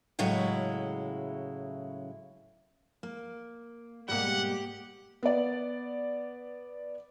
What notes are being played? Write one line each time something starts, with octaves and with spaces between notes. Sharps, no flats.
A2 C#3 F#3 G#3 E4
A#3
G#2 B2 G3 A#3 G4 F#5
B3 D5